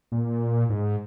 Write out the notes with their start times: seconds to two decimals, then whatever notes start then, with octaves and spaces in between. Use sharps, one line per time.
0.12 A#2
0.70 G#2